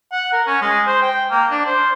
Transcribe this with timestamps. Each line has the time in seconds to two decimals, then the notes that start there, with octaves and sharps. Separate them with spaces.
0.12 F#5
0.33 A#4
0.47 C#4
0.61 G#3
0.87 C5
1.02 G5
1.31 A#3
1.51 D4
1.66 C5